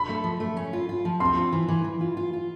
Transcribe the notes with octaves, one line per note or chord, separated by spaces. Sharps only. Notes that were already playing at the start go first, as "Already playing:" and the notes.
Already playing: B5
A3
F3
A3
C#4
F4
F4
F3
C4 C6
F4
E3
E3
E3
F4
F4
F4